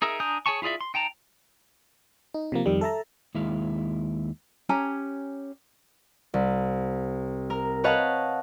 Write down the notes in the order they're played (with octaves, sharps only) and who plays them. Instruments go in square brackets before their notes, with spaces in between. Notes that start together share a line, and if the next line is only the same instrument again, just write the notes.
[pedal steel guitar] D#4 G#4 A#4 E5
D4 G#5 A#5 D#6 G6
G#4 C#5 G#5 A5 C#6
E4 F4 G#4 D5 E5
C6
D#4 G5 A5 A#5
[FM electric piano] D#4
C3 F3 A#3
F2 D#3 G3
A4 E5 A5 A#5
[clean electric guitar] D#2 G#3 E4 F5
[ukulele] C#4 G4 G#5 A#5
[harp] C2
A#4
B4 C#5 D#5 F5 F#5 A5